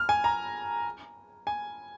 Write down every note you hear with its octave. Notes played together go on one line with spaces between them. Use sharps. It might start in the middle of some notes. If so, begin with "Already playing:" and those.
Already playing: F6
G#5
A#5
G#5